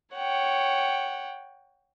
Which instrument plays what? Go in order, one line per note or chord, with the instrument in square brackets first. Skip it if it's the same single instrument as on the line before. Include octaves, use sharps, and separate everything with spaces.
[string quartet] C#5 F#5 G5